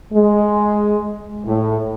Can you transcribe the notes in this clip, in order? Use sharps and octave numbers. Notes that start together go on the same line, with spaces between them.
G#3
A2